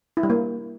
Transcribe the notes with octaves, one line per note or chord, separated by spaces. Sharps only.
E4
G3
A#3